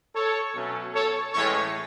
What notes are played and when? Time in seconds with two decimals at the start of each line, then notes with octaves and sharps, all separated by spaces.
0.15 A4 C#5
0.55 B2 F#3 A3 C#4
0.94 A4 C#5
1.33 A2 E3 G#3 C#4 A4 C#5